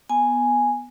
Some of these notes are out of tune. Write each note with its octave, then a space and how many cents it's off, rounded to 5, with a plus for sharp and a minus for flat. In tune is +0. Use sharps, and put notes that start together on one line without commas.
B3 +0 G#5 +0